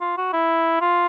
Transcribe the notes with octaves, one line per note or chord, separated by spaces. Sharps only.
F4
F#4
E4
F4